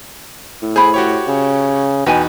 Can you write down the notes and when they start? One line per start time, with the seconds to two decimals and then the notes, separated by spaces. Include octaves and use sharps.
0.62 A2
0.76 G#4 C5 B5
0.94 F#4 G4 C#5
1.27 C#3
2.06 E2 B2 D#4 B4 G5 G#5